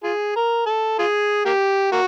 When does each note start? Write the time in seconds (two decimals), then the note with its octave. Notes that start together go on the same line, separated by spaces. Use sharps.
0.04 F4 G#4
0.36 A#4
0.66 A4
0.99 F4 G#4
1.45 A#3 G4
1.92 A#3 F#4